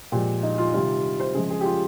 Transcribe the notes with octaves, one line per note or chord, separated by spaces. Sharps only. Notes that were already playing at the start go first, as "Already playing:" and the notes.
A#2 F3 G#3 G4
D#4
F4
C3 D#3 G3 F4
C5
C#3 F3 G#3 G#4
G#4
G4
F4